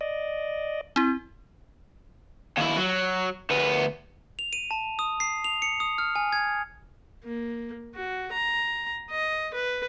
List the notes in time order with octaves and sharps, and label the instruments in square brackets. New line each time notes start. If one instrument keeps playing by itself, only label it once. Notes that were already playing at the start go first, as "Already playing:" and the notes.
[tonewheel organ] D5 D#5
[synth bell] C4 E4
[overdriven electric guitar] D#2 E4
F#3
D2 B3
[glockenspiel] F7
D#7
A5
D#6
C7
F7
C#7
D#6
F6
G#5
G#6
[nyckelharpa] A#3
F#4
A#5
D#5
B4